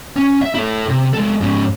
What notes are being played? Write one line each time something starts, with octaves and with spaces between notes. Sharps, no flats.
C#4
E5
E4 A4
C3
G#3 A4
G#2 C#4